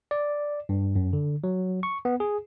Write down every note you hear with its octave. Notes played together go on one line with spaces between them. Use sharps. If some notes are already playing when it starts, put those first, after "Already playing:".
D5
G2
F#2
D3
F#3
C#6
B3
G#4